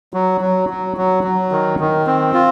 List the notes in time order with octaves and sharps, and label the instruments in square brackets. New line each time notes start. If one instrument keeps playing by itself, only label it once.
[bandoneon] F#3
F#3
F#3
F#3
F#3
D#3
D#3
C4
F4